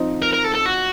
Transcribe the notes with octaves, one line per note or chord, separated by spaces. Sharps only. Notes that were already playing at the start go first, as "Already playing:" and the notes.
Already playing: F3 C4 D#4
A#4
A#4
A4
A4
F#4